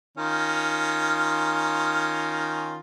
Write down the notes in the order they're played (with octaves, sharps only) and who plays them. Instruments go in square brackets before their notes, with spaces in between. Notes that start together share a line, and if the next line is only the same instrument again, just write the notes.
[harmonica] D#3 C#4 F4